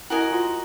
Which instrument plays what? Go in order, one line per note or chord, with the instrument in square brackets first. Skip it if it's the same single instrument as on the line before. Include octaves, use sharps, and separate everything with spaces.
[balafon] E4 [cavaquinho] F#4 A#4 D#5 G#5
[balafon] F4